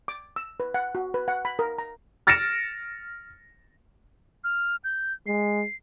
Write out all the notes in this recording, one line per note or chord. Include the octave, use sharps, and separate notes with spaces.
D6
E6
B4
F#5
F#4
B4
F#5
B5
A#4
A#5
F6 A6 A#6 C#7 D7 E7
F6
G6
G#3 C7